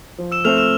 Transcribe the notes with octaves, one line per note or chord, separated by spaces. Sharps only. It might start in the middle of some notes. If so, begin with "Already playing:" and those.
F3
E6 E7
A3 C4 F6 F7
E6 E7